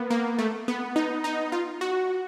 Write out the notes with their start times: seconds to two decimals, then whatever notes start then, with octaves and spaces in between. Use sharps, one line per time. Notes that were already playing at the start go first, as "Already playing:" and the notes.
Already playing: A#3 B3
0.10 A#3
0.39 A3
0.68 B3
0.96 D#4
1.24 D#4
1.52 F4
1.81 F#4